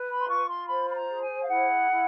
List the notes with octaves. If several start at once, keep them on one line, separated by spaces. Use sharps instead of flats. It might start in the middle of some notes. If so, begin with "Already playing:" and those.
Already playing: B4
B5
C6
F4 C#6
C6
C5 B5
B5
A#5
G#4
G#5
F5
E4 F#5
E4